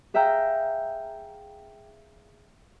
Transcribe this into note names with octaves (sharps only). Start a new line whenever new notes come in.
G#4 E5 F5 G5 A#5